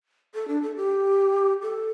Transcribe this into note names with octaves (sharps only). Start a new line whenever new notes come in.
A4
D4
A4
G4
A4